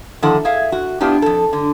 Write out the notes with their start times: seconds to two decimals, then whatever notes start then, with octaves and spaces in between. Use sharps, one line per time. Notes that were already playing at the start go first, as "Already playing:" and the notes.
0.22 D3 D#3 F3 E4 A4 F#5
0.45 G#4 E5 F5
0.72 F#4
1.01 B3 D4 E4 F4 G4
1.22 F2 A4
1.53 D3